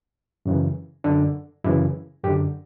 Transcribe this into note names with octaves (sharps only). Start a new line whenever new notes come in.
F#2 C#3 E3
F#2 D3 D4
F#2 C#3 E3 E4
F#2 D3 G4